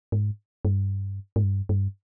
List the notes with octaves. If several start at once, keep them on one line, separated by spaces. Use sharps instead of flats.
G#2
G2
G#2
G2
G2